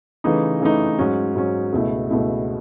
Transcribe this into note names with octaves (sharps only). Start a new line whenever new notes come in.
C#3 E3 A3 D#4
C#3 E3 A3 D#4
G#2 F#3 C#4
G#2 F#3 C#4
C#2 B2 A3 E4
C#2 B2 A3 E4